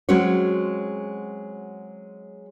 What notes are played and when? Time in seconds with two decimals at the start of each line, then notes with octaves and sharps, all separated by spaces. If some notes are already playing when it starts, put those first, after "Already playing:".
0.09 F#3 G#3 C4 C#4 F#4 C#5